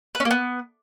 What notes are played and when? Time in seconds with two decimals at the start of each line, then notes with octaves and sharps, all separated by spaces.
0.15 B4
0.20 C#4
0.25 A#3
0.31 B3